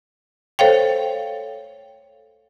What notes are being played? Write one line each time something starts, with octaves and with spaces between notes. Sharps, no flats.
A4 C5 C#5 F5 G5